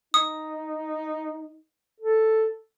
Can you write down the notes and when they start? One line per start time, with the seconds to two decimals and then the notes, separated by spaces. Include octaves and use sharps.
0.14 D#4 D#6
2.00 A4